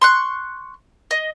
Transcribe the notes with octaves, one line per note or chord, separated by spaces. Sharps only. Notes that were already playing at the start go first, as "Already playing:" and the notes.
C6 C#6 F#6
D#5